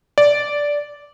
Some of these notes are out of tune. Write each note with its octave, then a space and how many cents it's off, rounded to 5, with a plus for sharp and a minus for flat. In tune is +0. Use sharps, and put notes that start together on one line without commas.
D5 -10